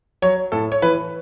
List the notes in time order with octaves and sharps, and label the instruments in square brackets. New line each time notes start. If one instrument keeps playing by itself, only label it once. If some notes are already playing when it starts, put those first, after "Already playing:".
[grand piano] F#3 C#5
A2 A4
C#5
E3 B4